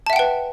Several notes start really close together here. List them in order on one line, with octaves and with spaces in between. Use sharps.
A5 E5 F#5 G5 B4